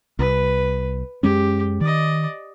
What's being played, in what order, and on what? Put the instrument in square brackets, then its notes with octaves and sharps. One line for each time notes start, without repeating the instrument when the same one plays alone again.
[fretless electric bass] C2 [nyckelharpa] B4
[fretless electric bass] F#2 G#3 C#4 [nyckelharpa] G4
[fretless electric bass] D#3 [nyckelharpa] D5 D#5